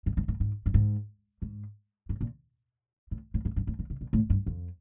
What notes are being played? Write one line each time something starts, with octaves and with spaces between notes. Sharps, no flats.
G#2
G#2
A2
G#2
G2
G#2
G#2
G#2
A#2
A2
A2
G#2
G2
A2
A#2
C3
A#2
A2
G2
F2